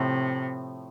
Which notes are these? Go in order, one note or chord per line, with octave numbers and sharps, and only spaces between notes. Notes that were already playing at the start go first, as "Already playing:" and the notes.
Already playing: A2 C3 F3 A3